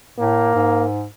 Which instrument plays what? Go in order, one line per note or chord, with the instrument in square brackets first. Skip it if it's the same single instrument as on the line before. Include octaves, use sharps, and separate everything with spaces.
[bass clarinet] A2 [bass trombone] A#3
[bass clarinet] G#2